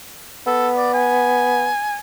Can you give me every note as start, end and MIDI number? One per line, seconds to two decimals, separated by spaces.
0.46 1.69 59
0.46 0.68 69
0.77 0.90 74
0.94 1.98 80